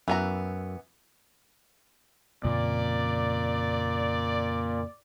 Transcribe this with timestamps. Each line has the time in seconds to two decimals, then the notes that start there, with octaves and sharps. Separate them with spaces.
0.08 F#2 E3 B3 A#5
2.44 F2 A#2 C#3 C4 D5